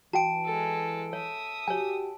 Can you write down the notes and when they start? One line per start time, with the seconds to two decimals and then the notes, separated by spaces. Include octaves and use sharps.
0.13 E3 F#4 G5 A5 D7
0.45 G#3 A4
1.13 C#5 E5 D#6
1.68 F#4 G4 C#5 G#5